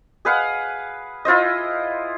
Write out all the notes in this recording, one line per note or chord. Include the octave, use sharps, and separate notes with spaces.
G#4 B4 F5 F#5
E4 F4 C5 D#5